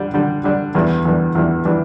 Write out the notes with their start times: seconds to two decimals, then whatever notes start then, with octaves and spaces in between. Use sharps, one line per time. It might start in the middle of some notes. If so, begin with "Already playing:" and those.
Already playing: D3 G3 D4
0.14 D3 G3 D4
0.44 D3 G3 D4
0.75 E2 E3 G3 D4
1.05 E2 E3 G3 D4
1.35 E2 E3 G3 D4
1.65 E3 G3 D4